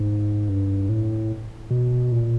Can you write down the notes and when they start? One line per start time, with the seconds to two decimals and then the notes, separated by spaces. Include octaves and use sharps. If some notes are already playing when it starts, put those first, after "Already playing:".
Already playing: G#2
0.49 G2
0.89 A2
1.70 B2
2.12 A#2